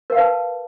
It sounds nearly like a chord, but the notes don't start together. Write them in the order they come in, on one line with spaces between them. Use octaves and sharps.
A#4 F#5 F5 B4 A5